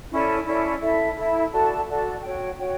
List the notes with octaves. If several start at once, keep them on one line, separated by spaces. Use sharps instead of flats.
C#4 E4 A4 D5
C#4 E4 A4 D5
E4 A4 E5
E4 A4 E5
F#4 A4 D5 A5
F#4 A4 D5 A5
F#4 C#5 G5
F#4 C#5 G5